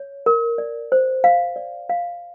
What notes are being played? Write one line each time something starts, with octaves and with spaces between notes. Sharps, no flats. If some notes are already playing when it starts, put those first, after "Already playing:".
Already playing: C#5
A#4
D5
C5
F5
D5
F5